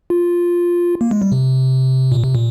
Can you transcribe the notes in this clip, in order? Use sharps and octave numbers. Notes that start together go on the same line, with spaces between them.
F4
A#3
G#3
G3
C3
A#2
C3
A#2